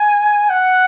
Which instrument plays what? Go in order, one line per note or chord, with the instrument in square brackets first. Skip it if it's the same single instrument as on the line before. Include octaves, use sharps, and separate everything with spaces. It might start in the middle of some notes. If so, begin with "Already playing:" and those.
Already playing: [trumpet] G#5
F#5